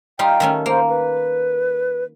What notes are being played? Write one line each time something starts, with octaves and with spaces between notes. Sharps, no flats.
G3 D#4 F4 G5
D#3 A3 C#4
A#3 C5
B4